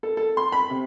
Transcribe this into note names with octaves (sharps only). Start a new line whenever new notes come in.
A4
A4
C6
B5
C3